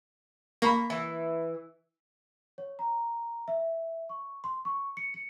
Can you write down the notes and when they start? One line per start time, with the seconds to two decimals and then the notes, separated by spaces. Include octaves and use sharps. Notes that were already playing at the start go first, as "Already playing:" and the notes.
0.62 A#3 B5 C#6
0.90 E3
2.58 C#5
2.79 A#5
3.48 E5
4.09 C#6
4.44 C6
4.65 C#6
4.97 C#7
5.14 C#7